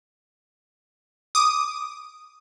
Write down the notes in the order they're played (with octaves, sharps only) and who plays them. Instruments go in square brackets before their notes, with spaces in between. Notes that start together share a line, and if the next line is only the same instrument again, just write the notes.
[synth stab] D6 D#6